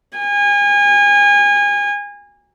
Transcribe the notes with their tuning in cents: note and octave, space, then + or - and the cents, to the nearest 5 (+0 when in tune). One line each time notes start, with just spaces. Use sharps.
G#5 -30